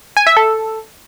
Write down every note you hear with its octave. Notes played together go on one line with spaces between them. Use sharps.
G#5
E5
A4